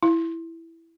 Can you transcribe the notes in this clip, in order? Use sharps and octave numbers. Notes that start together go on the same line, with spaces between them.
E4